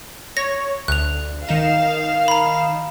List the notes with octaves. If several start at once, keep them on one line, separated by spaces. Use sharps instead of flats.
C#5 A#6
D2 F#6 F7
D#3 D#4 F5 E7
A#5 B5